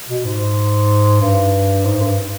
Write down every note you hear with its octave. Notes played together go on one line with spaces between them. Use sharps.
B2
G#2
G2
G#2
G2